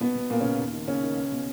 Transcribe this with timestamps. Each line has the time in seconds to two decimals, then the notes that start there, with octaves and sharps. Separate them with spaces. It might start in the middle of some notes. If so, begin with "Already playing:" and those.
0.01 B1 B2 B3
0.15 B2
0.30 B1 A#2 A#3
0.40 C#3 C#4
0.44 B2
0.59 D#2
0.73 D#3
0.88 D#2 C#3 C#4
1.03 D#3
1.17 C#2
1.32 B2